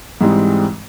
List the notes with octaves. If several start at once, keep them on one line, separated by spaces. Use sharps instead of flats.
G#2 E3 G3 G#3 C4